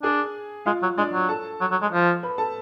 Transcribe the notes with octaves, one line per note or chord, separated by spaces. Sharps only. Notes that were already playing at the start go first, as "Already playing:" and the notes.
D4 G#4 G#5
G#3 F4 F5
F#3
G#3 D4 D5
F#3
A4 A5
F#3
F#3
G#3
F3
B4 B5
A4 A5